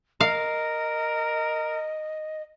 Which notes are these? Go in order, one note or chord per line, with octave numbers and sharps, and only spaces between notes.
A#4 D#5 F5